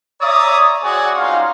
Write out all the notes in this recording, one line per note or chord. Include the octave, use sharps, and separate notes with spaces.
C#5 D5 E5 A#5 D#6
C4 F#4 G#4 C#5 D5 G#5
G3 G#3 C#4 D#4 F4 F5